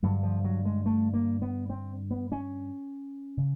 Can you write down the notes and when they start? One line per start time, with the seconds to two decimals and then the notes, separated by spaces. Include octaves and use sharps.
0.03 G2 D3 F#3
0.23 F3
0.44 F#3
0.65 G#3
0.86 A3
1.14 A#3
1.42 B3
1.70 C4
2.11 B3
2.32 C#4
3.37 C#3